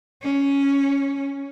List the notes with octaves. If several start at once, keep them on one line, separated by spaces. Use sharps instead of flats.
C#4